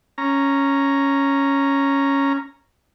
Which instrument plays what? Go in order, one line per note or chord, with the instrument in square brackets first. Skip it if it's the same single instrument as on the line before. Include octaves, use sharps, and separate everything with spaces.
[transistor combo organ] C#4 A#5